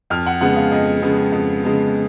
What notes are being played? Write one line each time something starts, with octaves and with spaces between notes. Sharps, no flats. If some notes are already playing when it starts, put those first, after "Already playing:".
F2 F6
F#5
C#3 G#3 B3 F#5
F5
F2 D#5
C#3 G#3 B3
F2
C#3 G#3 B3